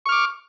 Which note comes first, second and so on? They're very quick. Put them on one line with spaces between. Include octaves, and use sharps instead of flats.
C#6 F6 D6